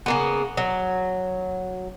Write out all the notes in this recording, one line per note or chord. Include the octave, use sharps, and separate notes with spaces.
C#3 A#3 B3
F#3